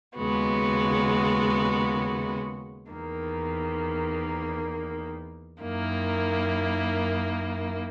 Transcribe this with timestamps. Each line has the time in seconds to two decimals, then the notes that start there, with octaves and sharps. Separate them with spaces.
0.17 D#2 C#3 G#3 B3 F#4
2.90 E2 D#3 A#3
5.61 F#2 D#3 A#3 E4